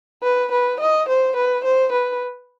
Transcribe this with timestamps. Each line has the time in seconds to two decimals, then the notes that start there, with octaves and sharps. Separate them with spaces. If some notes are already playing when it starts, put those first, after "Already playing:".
0.23 B4
0.52 B4
0.80 D#5
1.09 C5
1.36 B4
1.64 C5
1.92 B4